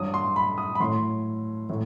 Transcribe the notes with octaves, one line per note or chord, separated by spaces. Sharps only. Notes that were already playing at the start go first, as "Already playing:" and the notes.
Already playing: G2 F#3 D#6
C6
B5
D#6
B5
A2 F#3 C6
A2 F#3